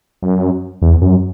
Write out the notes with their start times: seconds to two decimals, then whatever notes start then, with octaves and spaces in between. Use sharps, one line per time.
0.23 F#2
0.82 E2
1.02 F#2